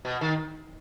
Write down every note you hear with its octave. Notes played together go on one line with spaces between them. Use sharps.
B2
D#3